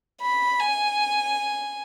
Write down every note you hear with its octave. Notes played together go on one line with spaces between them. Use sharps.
B5
G#5